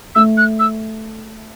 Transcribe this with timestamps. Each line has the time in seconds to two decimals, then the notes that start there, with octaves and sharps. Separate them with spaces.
0.15 A3 E6
0.37 F#6
0.59 E6